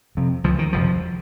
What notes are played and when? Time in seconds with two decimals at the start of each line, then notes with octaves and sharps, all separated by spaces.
0.15 F#1 F2 C3
0.44 C#2 C#3 F3
0.59 D#3
0.73 F#1 F2 C3 F3